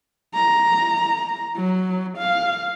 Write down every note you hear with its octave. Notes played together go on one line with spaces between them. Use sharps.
A#5
F#3
F5